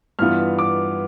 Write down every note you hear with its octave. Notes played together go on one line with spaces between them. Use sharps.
G2 E3 B3 F4 F6
D6